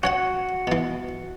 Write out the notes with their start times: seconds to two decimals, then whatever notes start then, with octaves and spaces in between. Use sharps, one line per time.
0.03 C#4 F#4 C#5 F#5
0.67 B2 E3